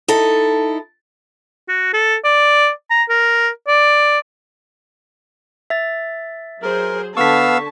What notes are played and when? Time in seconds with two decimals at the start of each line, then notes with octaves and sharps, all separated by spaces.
0.08 D#4 E4 A4
1.69 F#4
1.93 A4
2.25 D5
2.90 A#5
3.10 A#4
3.68 D5
5.70 E5 A6
6.62 F#3 G#4 A#4 C5
7.17 D3 B3 F5 A5 C#6 E6 B6